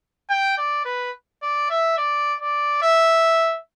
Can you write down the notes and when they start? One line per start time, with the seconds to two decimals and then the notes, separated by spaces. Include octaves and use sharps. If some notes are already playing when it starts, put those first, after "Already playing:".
0.30 G5
0.57 D5
0.85 B4
1.42 D5
1.70 E5
1.97 D5
2.41 D5
2.82 E5